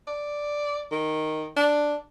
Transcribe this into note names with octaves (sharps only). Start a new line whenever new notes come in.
D5
D#3
D4